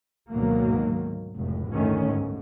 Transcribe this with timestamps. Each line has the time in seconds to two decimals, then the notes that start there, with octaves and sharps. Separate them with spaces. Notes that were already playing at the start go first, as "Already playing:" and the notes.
0.30 D2 G#2 B2 D#3 F#3 A#3
1.37 F1 C#2 A2
1.72 G1 D2 D#3 A3 C#4
2.06 G#2